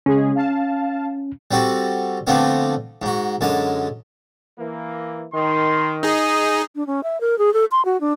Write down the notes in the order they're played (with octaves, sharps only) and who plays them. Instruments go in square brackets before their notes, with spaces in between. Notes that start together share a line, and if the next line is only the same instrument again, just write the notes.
[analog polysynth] C#3 G#3 G#4 [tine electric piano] C#4
[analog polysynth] F5 A5
[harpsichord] G3 C4 F#4 A4
D3 F3 A3 B3 C4 D4
G#2 F#4
F#2 D3 G#3 A5
[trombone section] E3 A#3
[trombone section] D#3 [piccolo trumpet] C6
[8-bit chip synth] D#4 G#4 [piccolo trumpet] D#6
[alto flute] D4
C#4
E5
A#4
G#4
A4
C6
F#4
D4